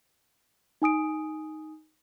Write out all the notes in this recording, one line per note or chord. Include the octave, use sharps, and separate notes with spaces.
D#4 G#5 D#6 D7